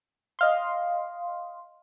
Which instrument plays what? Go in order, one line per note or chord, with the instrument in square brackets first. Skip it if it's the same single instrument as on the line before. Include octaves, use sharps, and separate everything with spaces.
[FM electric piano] D#5 F5 C6